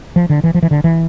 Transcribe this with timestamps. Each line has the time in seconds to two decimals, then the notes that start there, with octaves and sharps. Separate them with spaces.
0.16 F3
0.30 D3
0.44 E3
0.54 F3
0.63 E3
0.71 D3
0.84 E3